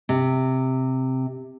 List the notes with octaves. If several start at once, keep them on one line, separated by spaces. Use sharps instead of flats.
C3